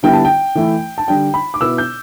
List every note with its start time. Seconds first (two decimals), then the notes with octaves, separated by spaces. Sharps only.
0.03 D3 G3 B3 E4 G5
0.13 A5
0.25 G5
0.56 E3 A3 E4
0.98 A5
1.08 D3 G3 D4 G5
1.34 B5
1.54 D6
1.61 B2 B3 E4 E6
1.78 G6